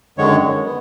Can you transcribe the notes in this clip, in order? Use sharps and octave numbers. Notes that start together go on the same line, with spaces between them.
F#2 D3 D#3 G#3 C#5
G#3
B3